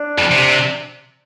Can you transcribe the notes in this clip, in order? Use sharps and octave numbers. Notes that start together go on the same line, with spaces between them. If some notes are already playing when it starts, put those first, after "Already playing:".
Already playing: D4
F2
C3